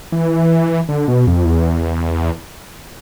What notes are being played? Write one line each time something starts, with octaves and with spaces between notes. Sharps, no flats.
E3
D3
B2
F2
E2